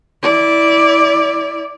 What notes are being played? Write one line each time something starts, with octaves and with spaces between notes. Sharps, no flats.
E4 D5